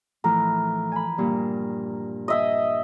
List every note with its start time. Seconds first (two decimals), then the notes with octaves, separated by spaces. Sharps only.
0.24 A2 E3 F3 A#4
0.92 G#5 B5
1.18 G2 A#2
2.28 D#5 E5 G#5